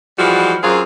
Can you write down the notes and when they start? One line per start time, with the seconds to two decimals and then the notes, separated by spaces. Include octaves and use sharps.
0.18 E3 F3 G3 G#3 F4 F#4
0.63 F#2 F#3 C4 F4 G#4